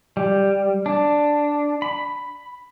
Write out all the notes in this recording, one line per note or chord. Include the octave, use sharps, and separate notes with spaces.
G3
D4
B5